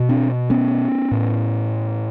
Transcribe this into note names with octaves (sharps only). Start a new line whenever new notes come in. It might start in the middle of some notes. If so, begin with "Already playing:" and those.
Already playing: B2
C4 D4
B3 C#4
A2